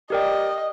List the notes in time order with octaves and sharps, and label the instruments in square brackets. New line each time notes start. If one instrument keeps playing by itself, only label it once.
[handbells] G4 A#4 D5 G5 [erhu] D#5